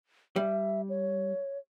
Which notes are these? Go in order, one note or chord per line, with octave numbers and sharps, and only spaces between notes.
G3 E5
C#5